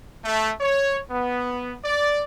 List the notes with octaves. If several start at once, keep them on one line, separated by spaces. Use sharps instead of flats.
A3
C#5
B3
D5